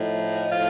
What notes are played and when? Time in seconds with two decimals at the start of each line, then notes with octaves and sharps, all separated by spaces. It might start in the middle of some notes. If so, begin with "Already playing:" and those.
Already playing: A2 F3 D#4
0.50 A2 F3 F4